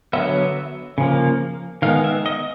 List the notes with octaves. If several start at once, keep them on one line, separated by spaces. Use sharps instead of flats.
D3 F#3 B3 E5
C#3 F3 A#3
D#3 G#3 B3 F5
E5
D#5